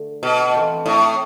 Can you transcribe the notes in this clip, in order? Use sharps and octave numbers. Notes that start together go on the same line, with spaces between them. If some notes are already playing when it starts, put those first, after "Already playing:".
Already playing: D3 A3 D4
B2
E3 A3 C4 F4
A2